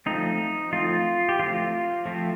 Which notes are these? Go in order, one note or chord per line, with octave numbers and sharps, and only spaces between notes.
F3 A3 C4 D#4
F3 A3 C4 F4
G4
F3 A3 C4 F4
F3 A3 C4